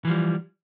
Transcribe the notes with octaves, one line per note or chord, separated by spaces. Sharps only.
E3 F3 G3